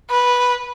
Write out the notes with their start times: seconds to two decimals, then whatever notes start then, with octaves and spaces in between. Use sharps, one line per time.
0.10 B4